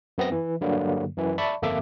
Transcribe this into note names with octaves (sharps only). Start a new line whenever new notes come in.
F#2 B3 C4 A#6
E3
G2 D3 F#3 G3 A#3
F#2 E3
D5 E5 A5 B5 C#6
G1 F2 A#3 A4 E5 D6